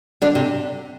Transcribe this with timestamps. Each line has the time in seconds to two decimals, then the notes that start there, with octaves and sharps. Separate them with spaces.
0.22 D3 D4
0.35 C3